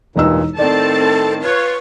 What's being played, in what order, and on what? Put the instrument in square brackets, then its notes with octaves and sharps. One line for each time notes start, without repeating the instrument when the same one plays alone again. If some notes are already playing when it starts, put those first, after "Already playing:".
[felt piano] E1 D#4 E6 [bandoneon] G2 A#2
[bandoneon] A2 D#3 [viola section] C4 A5 [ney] A4 [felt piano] D5
[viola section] F4 C#5 [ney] B4